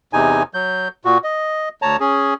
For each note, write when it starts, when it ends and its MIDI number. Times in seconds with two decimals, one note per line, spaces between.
0.13 0.43 40
0.13 0.43 48
0.13 0.43 63
0.13 0.43 80
0.54 0.88 54
0.54 0.88 91
1.05 1.18 46
1.05 1.18 66
1.24 1.69 75
1.82 1.97 38
1.82 1.97 73
1.82 1.97 81
1.82 1.97 82
2.00 2.34 61
2.00 2.34 68